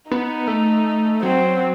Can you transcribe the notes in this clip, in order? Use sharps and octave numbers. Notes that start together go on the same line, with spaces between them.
B3 D#4
A3
F#3 C4